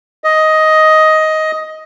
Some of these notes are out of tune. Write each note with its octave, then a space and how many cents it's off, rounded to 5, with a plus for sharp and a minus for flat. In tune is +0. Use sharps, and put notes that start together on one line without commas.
D#5 +10